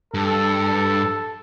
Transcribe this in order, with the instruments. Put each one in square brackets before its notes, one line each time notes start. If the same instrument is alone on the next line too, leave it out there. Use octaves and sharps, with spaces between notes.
[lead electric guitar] G2 [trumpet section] A4